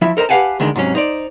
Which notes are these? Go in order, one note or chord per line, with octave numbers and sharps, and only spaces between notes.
F3 E4 E5
A4 A#4 C5 D#5 A#5
G4 B4 F5 F#5 G#5 A5
D2 D3 D#3 G#3
G#2 C3 F#3 C#4
D#4 C5 D5